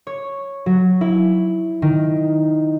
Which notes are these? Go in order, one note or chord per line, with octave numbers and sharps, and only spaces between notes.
C#5
F#3
E4
D#3